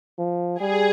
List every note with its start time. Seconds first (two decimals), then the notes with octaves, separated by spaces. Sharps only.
0.19 F3
0.60 G3 G#4